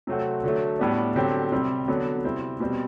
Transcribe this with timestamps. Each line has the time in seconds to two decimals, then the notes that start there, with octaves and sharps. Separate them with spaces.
0.07 C3 F#3 A3 C4 F#4
0.43 D3 F#3 A3
0.79 A2 G3 B3 D4
1.16 D3 F#3 C4 G4
1.52 C3 G3 C4
1.88 D3 F#3 B3
2.25 C3 G3 C4 E4
2.60 B2 G3 C4